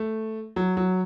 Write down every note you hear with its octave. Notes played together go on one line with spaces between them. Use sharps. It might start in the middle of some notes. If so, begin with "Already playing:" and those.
Already playing: A3
F#3
F#3